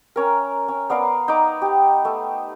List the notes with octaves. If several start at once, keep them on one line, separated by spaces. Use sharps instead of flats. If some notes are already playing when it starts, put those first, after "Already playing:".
C#4 A#4
C#4
B3 D5 F5 A#5
D#4 D6
G4
A3